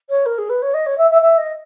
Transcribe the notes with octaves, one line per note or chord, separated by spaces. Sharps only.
C#5
A#4
G#4
B4
C#5
D#5
C#5
E5
E5
E5
D#5